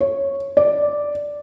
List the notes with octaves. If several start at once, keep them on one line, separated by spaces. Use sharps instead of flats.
C#5
D5